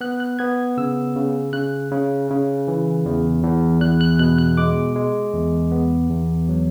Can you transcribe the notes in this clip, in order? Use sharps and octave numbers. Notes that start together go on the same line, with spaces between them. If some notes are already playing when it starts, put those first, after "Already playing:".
B3 F#6
F#6
B3 G#6
C#3 E6
C#3
C#3 F#6
C#3
C#3
E3
E2
E2
E2 F#6
F#6
B2 F#6
F#6
G#3 D6
G#3
E2
B3
E2
F#3